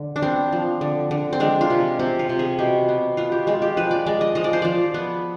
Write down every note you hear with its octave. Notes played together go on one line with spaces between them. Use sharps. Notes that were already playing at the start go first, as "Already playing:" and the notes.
Already playing: D3
D4
B3 C4
F3
D3
D3
C4
G#3 D4
F4
C3
C3 C4
F4
C3
G#4
B2 G4
B3
B3 F4
G4
G#3 F4
G4
F3 B4
D5
G#3 D5
D#5
F3 D#5
D5
C5
F3 D5
B3